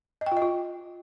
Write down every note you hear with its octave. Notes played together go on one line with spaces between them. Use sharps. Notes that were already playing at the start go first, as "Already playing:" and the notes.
D#5
G5
F4
D#5
F4